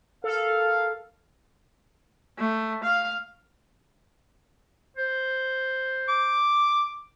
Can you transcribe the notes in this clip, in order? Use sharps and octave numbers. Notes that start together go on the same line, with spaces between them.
A4 A#4 F5
A3
F5
C5
D6